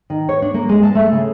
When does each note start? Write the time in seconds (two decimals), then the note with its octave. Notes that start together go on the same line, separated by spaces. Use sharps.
0.10 D#3
0.29 C#5
0.42 D4
0.54 A#3
0.69 G#3
0.83 A5
0.95 A3
1.12 C#3